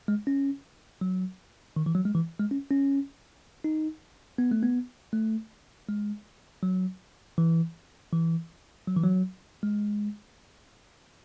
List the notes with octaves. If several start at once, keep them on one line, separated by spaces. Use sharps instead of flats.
G#3
C#4
F#3
D#3
E3
F#3
G#3
E3
G#3
C#4
C#4
D#4
B3
A3
B3
A3
G#3
F#3
E3
E3
F#3
E3
F#3
G#3